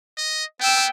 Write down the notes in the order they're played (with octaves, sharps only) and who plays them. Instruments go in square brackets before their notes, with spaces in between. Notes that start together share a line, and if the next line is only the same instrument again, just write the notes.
[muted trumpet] D#5
[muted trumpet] B3 [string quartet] G5 E6